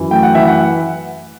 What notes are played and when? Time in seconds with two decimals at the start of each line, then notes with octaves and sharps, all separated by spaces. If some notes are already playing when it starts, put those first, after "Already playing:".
Already playing: F#2 E3
0.11 A3 G5
0.23 F#5
0.34 E3 E5
0.47 F#5